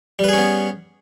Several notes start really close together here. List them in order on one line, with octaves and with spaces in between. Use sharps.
G3 B4 G#4 C#4 B3